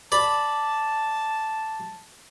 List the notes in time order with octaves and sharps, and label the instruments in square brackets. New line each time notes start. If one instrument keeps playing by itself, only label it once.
[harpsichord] D5 B5 [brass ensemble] A5